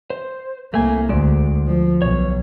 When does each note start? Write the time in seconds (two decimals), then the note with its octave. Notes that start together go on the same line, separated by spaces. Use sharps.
0.10 C5
0.74 C2 A3 A#3 G#5
1.09 D2 G#3 D5
1.67 F3
2.02 B1 C#5